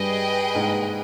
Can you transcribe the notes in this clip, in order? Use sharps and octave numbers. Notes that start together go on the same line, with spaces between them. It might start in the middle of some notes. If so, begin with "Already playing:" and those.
Already playing: G2 G3 G#4 B4 D#5 G5
G#2 G#3